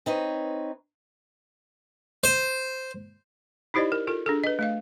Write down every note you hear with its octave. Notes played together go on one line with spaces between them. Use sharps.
C4 D#4 B4 C#5
C5
D#4 E4 G4 C5 D5 D#5
A#4
F4 A4 A#4
D4 G#4 A4
B4 D#5
A3 D#5 F5